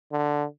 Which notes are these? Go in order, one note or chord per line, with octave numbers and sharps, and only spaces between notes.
D3